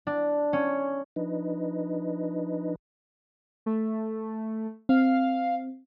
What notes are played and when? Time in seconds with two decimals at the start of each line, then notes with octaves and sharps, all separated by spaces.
0.07 D4
0.53 C#4
1.16 F3 D4 D#4 B4 D#5
3.66 A3
4.89 C4 F5